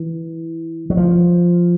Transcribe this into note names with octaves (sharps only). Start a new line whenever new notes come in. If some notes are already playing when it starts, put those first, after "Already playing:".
Already playing: E3
F#3
F3